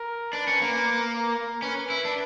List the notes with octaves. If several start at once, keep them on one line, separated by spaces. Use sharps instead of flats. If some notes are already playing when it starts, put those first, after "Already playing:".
Already playing: A#4
D4 B4
C#4
A#3
A#4
C#4 B4
E4
D4